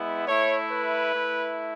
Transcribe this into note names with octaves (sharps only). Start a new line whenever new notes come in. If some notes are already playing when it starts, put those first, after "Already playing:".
Already playing: G#3 B3 E4
A3 E4 C#5
B4
A3 E4